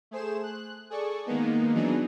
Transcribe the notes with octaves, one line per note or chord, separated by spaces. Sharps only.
A3 G#4 C5 E7
F#6
G#4 A4 D5 C#6
D#3 G#3 A#3 B3 D#4
E3 F#3 B3 D4 D#4 G#4